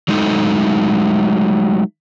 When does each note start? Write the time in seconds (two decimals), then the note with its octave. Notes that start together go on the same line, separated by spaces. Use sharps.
0.08 F#3 G#3 A3 D#4 G#4 A4